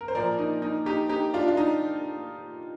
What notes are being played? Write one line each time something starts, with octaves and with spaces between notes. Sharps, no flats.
A#4
C5
A#2 F3 A#3 A#4 D5
D#4
D#4
D#4 G4
D#4 G4
D4 F4
F4
D#4